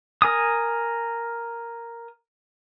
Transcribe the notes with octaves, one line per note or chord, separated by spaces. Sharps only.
A#4 G#5 D#6